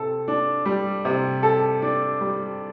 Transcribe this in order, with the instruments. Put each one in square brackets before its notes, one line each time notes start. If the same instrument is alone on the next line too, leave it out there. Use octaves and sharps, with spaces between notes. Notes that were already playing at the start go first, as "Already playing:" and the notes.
Already playing: [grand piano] C3 A4
D4
G3
C3
A4
D4
G3